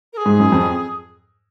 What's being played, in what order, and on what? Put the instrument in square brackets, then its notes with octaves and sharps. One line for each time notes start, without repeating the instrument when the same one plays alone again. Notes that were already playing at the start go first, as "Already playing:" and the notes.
[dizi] A#4
G#4
[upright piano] G#2
F#2
F2